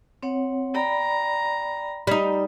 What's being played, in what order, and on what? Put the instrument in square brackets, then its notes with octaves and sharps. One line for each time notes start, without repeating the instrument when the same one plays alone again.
[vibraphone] C4 C#5 F#5
[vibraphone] D5 G5 B5 [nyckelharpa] A#5
[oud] G3 D#4